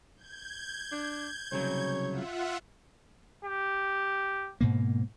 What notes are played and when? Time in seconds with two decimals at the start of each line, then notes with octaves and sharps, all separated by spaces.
0.16 G6 G#6
0.92 D4
1.52 C2 C#3 F#3 C#5
2.09 F4 E5 F#5
3.45 G4
4.61 G#2 B2 A#3